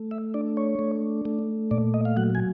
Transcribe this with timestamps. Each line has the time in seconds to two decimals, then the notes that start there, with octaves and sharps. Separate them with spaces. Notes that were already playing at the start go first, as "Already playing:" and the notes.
Already playing: A3
0.11 E5
0.34 D4 D5
0.57 C#5
0.79 A3
1.25 A3
1.71 A#2 D5
1.94 D#5
2.05 F5
2.17 F#3 F#5
2.35 G#5